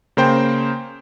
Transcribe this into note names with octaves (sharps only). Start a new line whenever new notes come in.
C#3 A#3 C5 G5